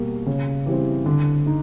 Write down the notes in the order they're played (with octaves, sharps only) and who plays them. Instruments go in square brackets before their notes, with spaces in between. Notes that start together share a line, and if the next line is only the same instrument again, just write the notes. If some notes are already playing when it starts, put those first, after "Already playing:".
Already playing: [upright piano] B2 G3 A#3
C#3
E3 G3 C4
D3
D#4